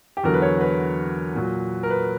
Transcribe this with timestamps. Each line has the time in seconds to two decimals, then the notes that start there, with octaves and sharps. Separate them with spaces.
0.17 G4
0.23 E2 D3 F#3 A#4
0.34 B4
0.42 C#5
0.61 B4
1.35 A#2 F#3
1.83 A#4
1.90 B4